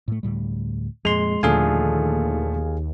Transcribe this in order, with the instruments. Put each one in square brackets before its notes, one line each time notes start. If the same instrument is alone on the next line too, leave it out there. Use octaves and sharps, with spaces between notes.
[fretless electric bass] A2 A3
D2 A2 G3
[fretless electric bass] F2 A#2 [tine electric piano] G#3 C6 [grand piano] F7
[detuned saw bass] D#2 [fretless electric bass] A#2 [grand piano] D3 F3 A3 [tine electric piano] G#4 F5 G#5